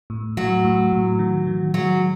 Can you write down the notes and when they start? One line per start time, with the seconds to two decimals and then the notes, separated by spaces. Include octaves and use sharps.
0.10 A2
0.37 A2 F#3
0.65 A2
0.92 A2
1.19 D#3
1.47 D#3
1.74 F#3 G#3